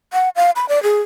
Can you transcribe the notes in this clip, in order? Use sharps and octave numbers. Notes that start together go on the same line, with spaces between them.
F#5
F5
B5
D5
G#4